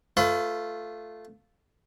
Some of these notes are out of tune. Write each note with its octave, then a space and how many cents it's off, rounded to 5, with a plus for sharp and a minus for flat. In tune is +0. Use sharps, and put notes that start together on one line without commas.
A3 +0 F4 +0 B4 +40